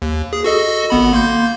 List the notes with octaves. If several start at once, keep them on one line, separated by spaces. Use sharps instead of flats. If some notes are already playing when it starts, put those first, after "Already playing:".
D#2
G#4
F#4 A4 D#5
G#1 B3 B5
A#3 C6 G6